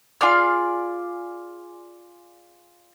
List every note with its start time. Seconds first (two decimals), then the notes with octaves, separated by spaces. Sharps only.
0.21 F4 G#4 D5 F6